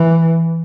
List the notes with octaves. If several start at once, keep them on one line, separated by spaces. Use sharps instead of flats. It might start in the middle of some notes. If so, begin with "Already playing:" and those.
Already playing: E3